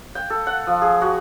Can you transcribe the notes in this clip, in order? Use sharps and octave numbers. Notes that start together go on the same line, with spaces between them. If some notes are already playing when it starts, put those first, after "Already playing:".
G5
A4
F#5
F3
G#4
F#4